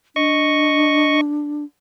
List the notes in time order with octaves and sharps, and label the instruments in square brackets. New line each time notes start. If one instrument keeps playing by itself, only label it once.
[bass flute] D4 [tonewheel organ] D#5 C#6